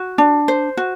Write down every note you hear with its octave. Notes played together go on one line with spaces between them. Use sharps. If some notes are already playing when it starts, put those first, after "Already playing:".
Already playing: F#4
D4
C5
F#4